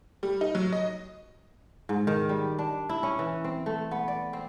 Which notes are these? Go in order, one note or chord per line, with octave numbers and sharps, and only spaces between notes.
G3
D#4
F#3
D#5
G#2
D#3
G3
D4
E4
C#4
E3
C4
A3
B3
D5
C4